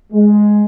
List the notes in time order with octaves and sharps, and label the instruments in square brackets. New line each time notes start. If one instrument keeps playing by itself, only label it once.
[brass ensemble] G#3